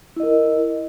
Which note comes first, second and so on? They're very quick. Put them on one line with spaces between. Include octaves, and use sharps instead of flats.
E4 D#5 A#4